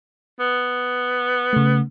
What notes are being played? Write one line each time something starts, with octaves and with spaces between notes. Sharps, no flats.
B3
C#3 A3